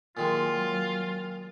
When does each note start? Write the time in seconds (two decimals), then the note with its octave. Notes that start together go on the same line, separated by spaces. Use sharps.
0.17 A#2 D#3 F#3 G#3 F4